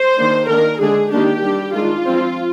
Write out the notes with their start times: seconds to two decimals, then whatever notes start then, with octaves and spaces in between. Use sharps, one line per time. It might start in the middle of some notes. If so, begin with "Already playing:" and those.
Already playing: C5
0.17 D#3 A#3 D4
0.48 D#3 A#3 D4 A#4
0.80 D3 G#3 D4 G#4
1.11 D#3 A#3 D4 G4
1.43 G3 D4
1.74 D#3 G#3 D4 F4
2.06 F3 C4